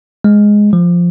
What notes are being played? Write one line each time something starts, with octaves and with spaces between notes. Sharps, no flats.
G#3
F3